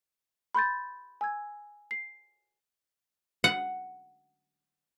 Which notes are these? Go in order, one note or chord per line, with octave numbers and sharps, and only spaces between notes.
B5 C6 G6 A6
G#5 E6 G#6
C7
F#5